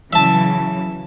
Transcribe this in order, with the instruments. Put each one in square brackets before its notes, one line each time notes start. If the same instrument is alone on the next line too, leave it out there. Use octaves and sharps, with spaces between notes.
[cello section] C#3 E3 F#3 [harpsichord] E5 A5